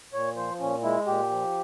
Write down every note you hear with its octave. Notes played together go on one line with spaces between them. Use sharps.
A#2 C#5
F3 C5
A#2 C#4
G#3 E4
A#2 G4
F3